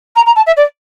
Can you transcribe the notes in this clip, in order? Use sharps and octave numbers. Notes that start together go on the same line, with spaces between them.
A#5
A#5
A5
E5
D5